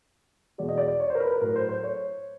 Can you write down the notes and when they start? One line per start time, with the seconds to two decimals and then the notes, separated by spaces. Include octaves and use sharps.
0.58 E2 B2 G#3 D5
0.69 D#5
0.78 D5
1.00 C#5
1.10 C5
1.15 A#4
1.20 B4
1.31 A#4
1.41 A2 F#3 A3 A#4
1.56 C5
1.69 C5
1.83 C#5